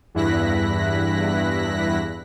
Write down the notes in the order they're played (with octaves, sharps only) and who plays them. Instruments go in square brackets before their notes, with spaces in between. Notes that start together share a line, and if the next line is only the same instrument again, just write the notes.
[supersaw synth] E2 G2 E4 F#6 A#6 B6